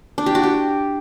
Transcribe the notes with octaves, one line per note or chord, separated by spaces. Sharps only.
D4
G4
F#4
G4